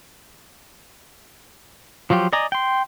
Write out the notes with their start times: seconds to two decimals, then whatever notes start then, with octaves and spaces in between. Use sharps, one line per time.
2.10 F3 F#3 F4 G4
2.33 D5 D#5 G#5 A#5
2.52 G5 C6